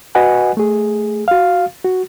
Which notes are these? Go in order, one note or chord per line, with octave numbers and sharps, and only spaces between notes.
F#4 B4 D#5 F#5 G#5
A3 G#4
F#4 F5
F#4